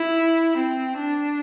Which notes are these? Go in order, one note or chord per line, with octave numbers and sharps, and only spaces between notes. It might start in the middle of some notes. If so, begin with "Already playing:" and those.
Already playing: E4
C4
D4